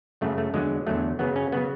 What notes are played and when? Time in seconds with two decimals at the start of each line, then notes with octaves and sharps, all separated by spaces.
0.21 F#2 C#3 F#3 A3
0.38 A3
0.54 E2 D3 F#3 G#3
0.87 E2 D3 F#3 A3
1.19 F#2 C#3 F#3 B3
1.36 C#4
1.52 C#3 F#3 B3